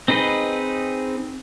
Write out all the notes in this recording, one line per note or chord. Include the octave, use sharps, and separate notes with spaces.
C4 D#4 G#4 B4 D#5